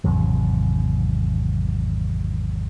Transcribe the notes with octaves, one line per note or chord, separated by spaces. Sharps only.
G#1 E2 C3 F#3